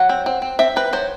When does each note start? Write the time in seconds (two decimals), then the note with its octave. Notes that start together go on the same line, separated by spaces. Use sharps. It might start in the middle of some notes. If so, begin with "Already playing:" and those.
Already playing: F#3 F#5
0.09 C4
0.26 C4
0.42 C4
0.59 C4 E5
0.76 C4 B4
0.93 F#3 C5